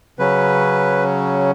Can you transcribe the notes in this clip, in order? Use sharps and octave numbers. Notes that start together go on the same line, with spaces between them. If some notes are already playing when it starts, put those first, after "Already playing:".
C#3 F#3 C#4 B4